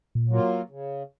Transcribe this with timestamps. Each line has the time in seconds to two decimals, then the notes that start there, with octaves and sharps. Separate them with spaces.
0.15 A#2
0.29 F#3 A#3 F4
0.70 C#3